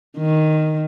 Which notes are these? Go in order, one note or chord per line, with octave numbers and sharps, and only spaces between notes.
D#3